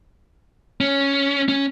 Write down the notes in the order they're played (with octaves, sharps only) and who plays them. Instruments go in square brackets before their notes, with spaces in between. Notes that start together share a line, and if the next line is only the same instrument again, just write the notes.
[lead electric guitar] C#4
C#4